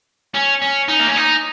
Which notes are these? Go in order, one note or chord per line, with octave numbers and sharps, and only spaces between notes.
C#4
C#4
D#4
A#3
C#4
D#4